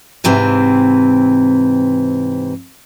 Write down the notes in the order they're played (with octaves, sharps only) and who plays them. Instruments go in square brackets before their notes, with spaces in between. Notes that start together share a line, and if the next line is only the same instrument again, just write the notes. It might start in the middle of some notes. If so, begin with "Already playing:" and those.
[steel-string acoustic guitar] G#2 C3 E3 C4